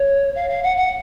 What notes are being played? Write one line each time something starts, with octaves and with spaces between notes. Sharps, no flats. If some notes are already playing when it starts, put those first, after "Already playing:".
Already playing: C#5
F5
F5
F#5
F#5